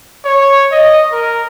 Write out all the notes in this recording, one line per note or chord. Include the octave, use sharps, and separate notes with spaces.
C#5
D#5
A#4